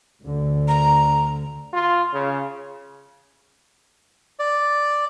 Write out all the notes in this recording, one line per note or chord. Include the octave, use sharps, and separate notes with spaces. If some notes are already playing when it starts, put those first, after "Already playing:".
D2 D3
A#5
F4
C#3
D5